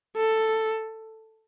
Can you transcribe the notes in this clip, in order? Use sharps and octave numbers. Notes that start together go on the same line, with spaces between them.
A4